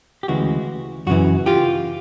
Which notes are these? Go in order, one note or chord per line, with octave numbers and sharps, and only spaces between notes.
G4
D2 C#3 E3 G#3 F#4
F#2 C#3 E3 F#4
F4 G4